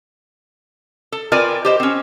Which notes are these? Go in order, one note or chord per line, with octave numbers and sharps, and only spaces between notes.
A4
C4 F4 A#4 B4 D5 G#5
G4 C5 D#5
C4 C#4